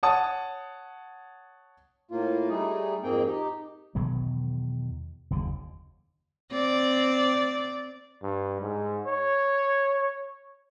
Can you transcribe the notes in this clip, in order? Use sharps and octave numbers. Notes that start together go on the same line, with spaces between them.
C#5 F#5 A5 D#6
A2 A#3 F4
G3 A3 D#4 G#4
F2 G#2 A#3 C4 G#4 G5
D#4 G4
E2 B2 D#3 F#3
F#1 D#2 D3
C4 D5
G2
G#2
C#5